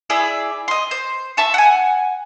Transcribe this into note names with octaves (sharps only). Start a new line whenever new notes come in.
E4 G#4 D5 E5
D#5 C6
C5
E5 A5 C#6
F#5 G#5